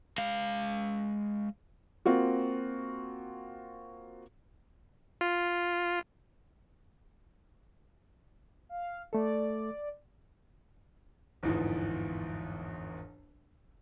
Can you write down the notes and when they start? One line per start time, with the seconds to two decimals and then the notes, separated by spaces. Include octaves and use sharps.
0.18 G#3 F5
2.06 A#3 C4 F4 F#4
5.21 F4
8.69 F5
9.13 A3 A4 D5
11.43 G1 E2 G#2 E3 F3